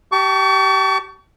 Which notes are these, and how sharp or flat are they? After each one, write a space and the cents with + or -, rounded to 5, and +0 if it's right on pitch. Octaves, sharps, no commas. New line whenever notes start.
G4 -25 A5 +5 C#6 +35